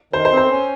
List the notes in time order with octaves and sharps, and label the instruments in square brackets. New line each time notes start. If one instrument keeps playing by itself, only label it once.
[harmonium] D#3 [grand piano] C5
[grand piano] C5
[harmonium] C4
[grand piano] C5
[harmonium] C#4